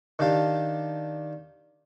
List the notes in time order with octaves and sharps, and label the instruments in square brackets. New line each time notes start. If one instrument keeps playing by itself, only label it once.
[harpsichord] D#3 D4 G4 F5 A5